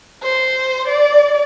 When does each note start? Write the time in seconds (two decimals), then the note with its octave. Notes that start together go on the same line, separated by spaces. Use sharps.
0.22 C5
0.88 D5